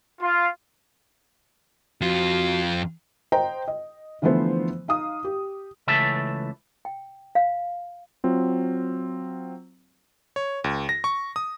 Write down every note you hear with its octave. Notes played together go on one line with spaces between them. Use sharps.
F4
F2 F4 F#4
C5 D#5 G5 A#5
D#5
D3 E3 F3 A3 B3 C5
D#4 F5 D#6
G4
C#2 C#3 E3 A3 E5 A5
G5
F5
F#3 C4 F4
C#5
C#2
A#6
C#6
D#6